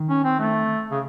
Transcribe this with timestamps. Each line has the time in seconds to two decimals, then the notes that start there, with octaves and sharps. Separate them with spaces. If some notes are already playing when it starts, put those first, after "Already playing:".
Already playing: D#3
0.09 C#4
0.24 C4
0.39 A3
0.91 C#3